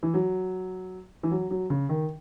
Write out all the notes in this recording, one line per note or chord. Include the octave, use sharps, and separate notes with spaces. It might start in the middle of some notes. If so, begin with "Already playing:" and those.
E3
F#3
E3
F#3
F#3
C#3
D#3